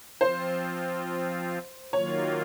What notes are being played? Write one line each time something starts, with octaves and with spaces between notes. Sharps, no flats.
F3 C4 F4 C5
D#3 F#3 A#3 F4 C#5